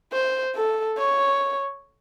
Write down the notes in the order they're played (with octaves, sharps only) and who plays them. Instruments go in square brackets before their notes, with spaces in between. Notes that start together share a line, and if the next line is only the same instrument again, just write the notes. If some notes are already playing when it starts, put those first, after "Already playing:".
[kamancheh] C5
A4
C#5